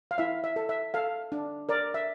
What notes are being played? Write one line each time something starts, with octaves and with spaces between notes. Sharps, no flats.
F5
E4 E5
E5
A4
E5
A4 F5
D4
A#4 D5
E5